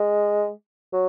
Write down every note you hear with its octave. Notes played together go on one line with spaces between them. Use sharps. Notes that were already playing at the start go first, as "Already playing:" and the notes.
Already playing: G#3
F#3